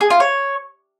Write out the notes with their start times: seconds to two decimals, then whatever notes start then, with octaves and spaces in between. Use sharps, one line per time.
0.01 G#4
0.10 F4
0.20 C#5